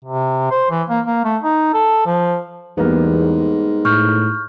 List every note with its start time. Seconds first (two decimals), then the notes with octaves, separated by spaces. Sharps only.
0.05 C3
0.51 C5
0.71 E3
0.90 A#3
1.06 A#3
1.25 A3
1.43 D#4
1.74 A4
2.06 F3
2.77 E2 G#2 G3 A#3 B3
3.85 A2 C#6 F6 G6